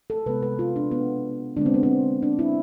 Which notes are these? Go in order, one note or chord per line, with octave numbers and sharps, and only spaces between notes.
A4
C3 G#3 B3 B4
B4
F4
D4
B3
D3 G#3 B3 D4
C4
B3
C4
D4
E4